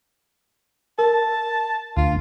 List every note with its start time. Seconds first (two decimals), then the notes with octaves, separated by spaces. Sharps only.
0.99 A#4 A5
1.97 D2 F4